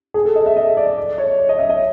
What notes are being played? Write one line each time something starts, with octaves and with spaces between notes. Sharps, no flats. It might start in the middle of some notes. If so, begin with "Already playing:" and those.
G#4
A4
D#5
E5
D#5
D5
D5
C#5
D#5
E5
D#5